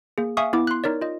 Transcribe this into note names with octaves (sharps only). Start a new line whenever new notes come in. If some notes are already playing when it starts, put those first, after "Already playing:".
A#3 G#4
E5 F5 G#5 C#6 D#6
B3 E4 D6
C6 F#6
D#4 A#4 C#5 D5
F4 D#5